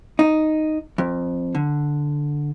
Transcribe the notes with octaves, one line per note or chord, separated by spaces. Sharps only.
D#4
F2
D3